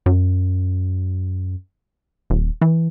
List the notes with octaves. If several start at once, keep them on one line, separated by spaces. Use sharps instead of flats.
F#2
D#1
E3